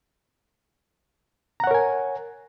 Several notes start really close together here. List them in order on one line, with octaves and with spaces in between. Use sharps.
A#5 F#5 C#5 A#4 G#5